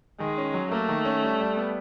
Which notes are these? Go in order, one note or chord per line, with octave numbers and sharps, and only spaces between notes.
D#3 G#3
C#4
F#3
A3 A#3
D#3
C#4
G3
G3
B3